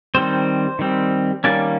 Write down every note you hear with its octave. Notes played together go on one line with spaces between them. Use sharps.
D#3 G3 C4 C5
D#3 G3 C4
D#3 G3 A#3 C#4 D5